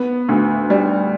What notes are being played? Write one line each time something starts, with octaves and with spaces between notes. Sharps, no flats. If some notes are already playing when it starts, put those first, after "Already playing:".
Already playing: B3
D2
G3